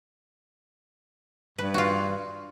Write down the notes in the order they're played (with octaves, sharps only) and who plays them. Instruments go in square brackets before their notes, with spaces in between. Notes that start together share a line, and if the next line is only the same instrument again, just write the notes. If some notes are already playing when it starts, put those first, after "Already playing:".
[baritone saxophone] G2 [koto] B4
[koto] F4 F#4